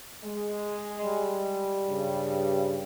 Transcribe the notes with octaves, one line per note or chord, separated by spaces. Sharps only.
G#3 G#4
G3
G2 C#3